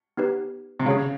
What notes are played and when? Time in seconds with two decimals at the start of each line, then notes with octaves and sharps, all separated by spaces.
0.17 B3 D#4 G4 B4
0.80 C3
0.86 C#3 G#4 C#5 F5